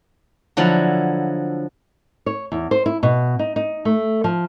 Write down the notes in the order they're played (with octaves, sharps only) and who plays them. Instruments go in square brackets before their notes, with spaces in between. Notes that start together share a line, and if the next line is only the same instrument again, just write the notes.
[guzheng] D3 F3 F#3 E4
[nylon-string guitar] C#5
E2
C5
E4
B2
D#4
D#4
A3
F3